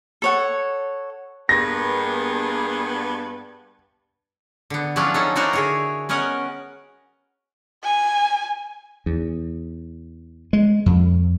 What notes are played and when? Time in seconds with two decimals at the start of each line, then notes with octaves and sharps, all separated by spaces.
0.22 A4 C#5 F#5
1.49 G2 A#3 B3 G#4 G5 A#6
4.70 D3 B3
4.96 F3 F#3 C#4 D4 E4 F4
5.14 C#4 D#4 A4
5.36 D#4 E4 F#4 A#4 C5 D5
5.53 D3 G#4 C#5
6.09 B3 C#4 A#4 D#5 F#5 G#5
7.83 G#5
9.06 E2
10.53 G#3
10.86 F2